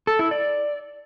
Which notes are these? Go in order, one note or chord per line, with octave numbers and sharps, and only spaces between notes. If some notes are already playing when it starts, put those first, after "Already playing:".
A4
E4
D5